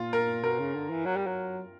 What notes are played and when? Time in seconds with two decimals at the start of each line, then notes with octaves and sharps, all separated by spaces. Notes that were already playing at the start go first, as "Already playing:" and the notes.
Already playing: A#2 F4
0.13 A#4
0.43 B2 A#4
0.59 C#3
0.75 D3
0.90 E3
1.05 F#3
1.16 G3
1.27 F#3